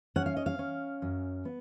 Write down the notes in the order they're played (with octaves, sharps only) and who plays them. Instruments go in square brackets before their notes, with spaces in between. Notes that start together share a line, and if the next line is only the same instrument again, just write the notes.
[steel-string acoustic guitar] C#4 F#5
F5
D#5
F5
C#4
F#2
B3